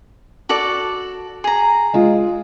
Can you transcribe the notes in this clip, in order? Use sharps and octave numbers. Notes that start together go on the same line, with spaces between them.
F#4 A4 D5
G#4 A#5
G#3 F4